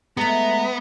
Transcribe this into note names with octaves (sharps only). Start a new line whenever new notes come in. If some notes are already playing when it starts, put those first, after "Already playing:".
G#3 A3 B3 A#5